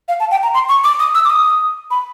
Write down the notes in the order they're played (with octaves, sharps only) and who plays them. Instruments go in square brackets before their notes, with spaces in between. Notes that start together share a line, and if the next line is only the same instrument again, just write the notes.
[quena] F5
A5
G5
A#5
C6
C#6
D6
D#6
E6
D6
D#6
B5